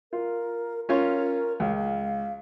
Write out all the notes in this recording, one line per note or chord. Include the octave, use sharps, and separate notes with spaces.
F4 A#4
C#4 F4 A#4 C#5
C#2 F5
F5